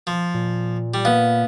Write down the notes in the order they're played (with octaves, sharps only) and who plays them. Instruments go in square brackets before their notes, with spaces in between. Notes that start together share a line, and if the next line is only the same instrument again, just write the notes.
[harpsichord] F3
[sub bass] A#2
[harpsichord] G3
[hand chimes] A#3 F5 [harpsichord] B3